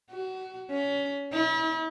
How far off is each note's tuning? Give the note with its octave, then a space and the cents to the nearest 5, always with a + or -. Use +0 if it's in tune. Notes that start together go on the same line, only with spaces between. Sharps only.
F#4 +25
C#4 +25
E4 -40